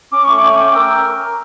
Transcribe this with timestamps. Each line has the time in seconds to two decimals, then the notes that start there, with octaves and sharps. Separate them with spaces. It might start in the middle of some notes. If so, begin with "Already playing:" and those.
0.12 C#4 D6
0.24 A3 C#6
0.39 C#4 D6
0.51 C#6
0.59 G5 D6
0.75 A#4 E6